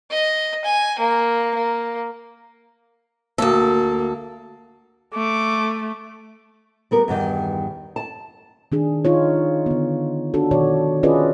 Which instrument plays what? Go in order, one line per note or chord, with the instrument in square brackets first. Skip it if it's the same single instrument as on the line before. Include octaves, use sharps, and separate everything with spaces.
[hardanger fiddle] D#5
G#5
A#3
A#3
[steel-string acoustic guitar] D2 A4 [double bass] A#3
[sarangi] A3 [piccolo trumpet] D6
[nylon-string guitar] G3 B3 A#4
E2 G2 D#3
A5
[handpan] D#3 D4 G#4
D#4 F4 C#5
D3 B3
D4 F#4 A4
B2 D#3 F#4 C#5 D5
C#4 F4 G#4 B4 D5 D#5